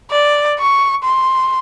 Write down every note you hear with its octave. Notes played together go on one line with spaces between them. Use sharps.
D5
C#6
C6